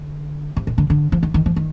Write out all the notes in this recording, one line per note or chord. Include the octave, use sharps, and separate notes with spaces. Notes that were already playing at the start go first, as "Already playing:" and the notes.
Already playing: D3
C3
A#2
D3
D3
F3
D#3
D#3
F3
D#3